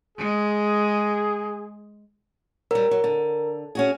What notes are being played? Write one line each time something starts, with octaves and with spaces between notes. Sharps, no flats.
G#3 G#4
F#3 G3 A#4
F#3
D3
C#4 F#4 G#4